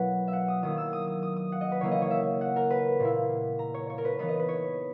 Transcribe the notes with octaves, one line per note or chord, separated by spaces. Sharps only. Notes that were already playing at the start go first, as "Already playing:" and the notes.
Already playing: B2 F#3 A#3 E4 B4 C#5 F#5
E5
F#5
D#6
D#3 F#3 A#3 E4 D#6
E6
D#6
D#6
D#6
D#6
F#5
D#5
B4
C#3 E3 A#3 E4 C#5
D#5
C#5
E5
F#5
A#4
B4
A#2 A#3 E4
A#5
C#5
C#5
A#4
B4
E3 B3 D#4 B4
D#5
B4
C#5